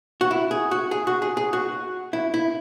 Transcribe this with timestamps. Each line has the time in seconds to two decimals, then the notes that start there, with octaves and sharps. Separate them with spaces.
0.21 F#4
0.31 E4
0.51 G#4
0.71 F#4
0.91 G#4
1.07 F#4
1.22 G#4
1.37 G#4
1.53 F#4
2.13 E4
2.34 E4